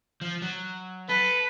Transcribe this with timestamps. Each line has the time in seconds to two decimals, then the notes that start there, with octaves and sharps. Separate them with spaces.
0.21 F3
0.42 F#3
1.09 A4 B4